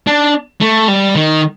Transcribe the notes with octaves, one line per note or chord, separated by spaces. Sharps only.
D4
A3
G3
D#3